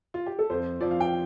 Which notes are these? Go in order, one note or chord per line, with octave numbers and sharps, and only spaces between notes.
F4
G4
A4
F2 F3 C5
F2 F3 D5
F5
G5